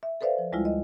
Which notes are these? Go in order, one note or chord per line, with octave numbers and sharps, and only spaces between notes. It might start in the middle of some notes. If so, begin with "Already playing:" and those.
E5
A4 B4 C5 D5 E5 F5
F3
D2 G3 G#3 E4 F4
D#5